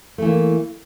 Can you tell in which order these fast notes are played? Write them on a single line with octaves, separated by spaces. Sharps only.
A3 E3 A#3